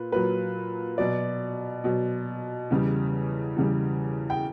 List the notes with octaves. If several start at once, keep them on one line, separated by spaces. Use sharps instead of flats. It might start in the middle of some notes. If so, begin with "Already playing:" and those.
Already playing: A#2 B4
A#2 F#3 B4
B2 F#3 D5
B2 F#3
E2 C#3 G3
E2 C#3 G3
G5